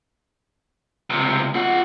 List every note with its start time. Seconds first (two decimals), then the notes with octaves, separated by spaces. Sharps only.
1.10 C#2 C3
1.55 F4 F#5